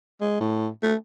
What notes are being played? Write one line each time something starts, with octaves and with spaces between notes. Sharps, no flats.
G#3
A2
A3